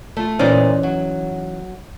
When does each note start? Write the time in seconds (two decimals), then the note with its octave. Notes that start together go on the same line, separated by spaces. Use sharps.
0.17 A3 F4
0.39 A#2 E3 C#4 D#4 C5 D5
0.83 F#3